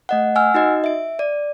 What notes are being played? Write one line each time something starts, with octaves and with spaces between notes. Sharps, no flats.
A3 D#5 F#5
F#5 G#5 E6 F6
D#4 F#4 D#5
E5 D7
D5